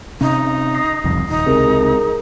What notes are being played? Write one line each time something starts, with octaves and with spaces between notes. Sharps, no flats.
C3 C#4 D#4
D#6 A#6 C7
F#1 C2 F2
D#1 D#4
C#2 C3 G#4 A#4